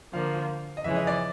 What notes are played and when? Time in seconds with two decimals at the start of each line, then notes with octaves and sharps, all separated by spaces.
0.13 D3 F3 A#3 F5
0.77 D#5
0.84 F2 C#3 E3 G#3 C#4 E5
0.96 D#5
1.07 D5